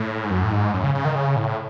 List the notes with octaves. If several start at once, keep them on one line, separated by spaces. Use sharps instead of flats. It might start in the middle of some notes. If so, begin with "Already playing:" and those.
Already playing: A2
G#2
F#2
A2
G#2
F#2
C#3
C#3
D#3
C#3
A2